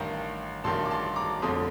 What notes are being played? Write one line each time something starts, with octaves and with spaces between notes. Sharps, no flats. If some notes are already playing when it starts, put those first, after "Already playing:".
Already playing: A1 G2 D#3 G5 A#5
A1 G2 D#3 A5 C6
D6
A5 C6
A#5 D6
G1 F2 D3 A3 C6 D#6